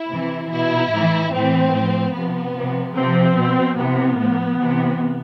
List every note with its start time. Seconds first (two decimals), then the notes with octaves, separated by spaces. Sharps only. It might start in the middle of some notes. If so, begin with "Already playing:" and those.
Already playing: E4
0.10 C3 E3
0.52 B2 E4
0.91 A2 E3
1.32 A2 E3 C4
1.74 A2 F3
2.14 C3 F3 B3
2.55 C3 F3
2.95 C3 F3 C4
3.36 B2
3.77 C3 E3 B3
4.19 A2 F3
4.60 C3 E3